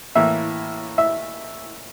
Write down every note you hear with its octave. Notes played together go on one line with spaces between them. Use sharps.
A2 E3 A#3 E5
E5